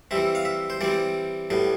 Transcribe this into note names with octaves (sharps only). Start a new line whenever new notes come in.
E3 G3 C4 E5
F5
E5
C5
E3 G3 C4 D5
A2 G3 B3